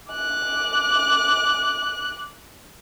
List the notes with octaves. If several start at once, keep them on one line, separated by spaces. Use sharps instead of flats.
D6 F#6